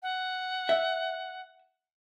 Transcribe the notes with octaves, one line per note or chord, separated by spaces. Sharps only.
F#5
E5